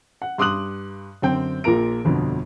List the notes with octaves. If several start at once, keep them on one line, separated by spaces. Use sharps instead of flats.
F#5
G2 C6 D6 D#6 F#6 F#7
F#2 D3 C4 G5
A#1 A#2 F3 A#4 A#5 D7
G1 F2 B2 D3